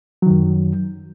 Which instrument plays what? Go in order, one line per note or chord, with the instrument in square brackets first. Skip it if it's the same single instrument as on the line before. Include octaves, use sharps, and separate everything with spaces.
[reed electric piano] F#3
D#3
F#2